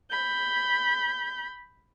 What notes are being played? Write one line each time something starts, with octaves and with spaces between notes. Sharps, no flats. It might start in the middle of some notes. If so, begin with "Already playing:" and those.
B5 G6